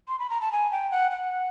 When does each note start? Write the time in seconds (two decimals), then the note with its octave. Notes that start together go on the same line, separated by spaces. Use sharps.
0.08 C6
0.19 B5
0.30 A#5
0.41 A5
0.52 G#5
0.72 G5
0.91 F#5
1.11 F#5